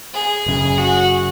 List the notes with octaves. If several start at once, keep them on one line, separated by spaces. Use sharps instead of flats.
G#4
F#1 F#2 C#3
F#4